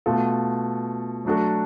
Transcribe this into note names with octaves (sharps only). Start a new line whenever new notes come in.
B2 A3 F4 A4
F#3 A3 D4 F#4 A4